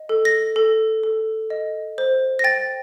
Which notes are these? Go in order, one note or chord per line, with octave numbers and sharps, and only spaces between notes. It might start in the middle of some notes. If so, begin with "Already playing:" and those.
Already playing: D#5
A4
A#6
A4
A4
D#5
C5
A#6
G5 A6